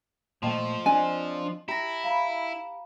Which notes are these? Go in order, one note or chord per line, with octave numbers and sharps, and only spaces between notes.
A#2 F3 A3 D#5 G5 A5
C4 D4 D#5 G#5
E4 G4 A#5 A#6
F5 A#5 B5